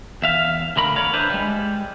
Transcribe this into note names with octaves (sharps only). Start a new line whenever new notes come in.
E2 E5 F5
D2 D3 A#4 B5
C#5 D5 F5
D4 E4 B4 C5
G3 G#3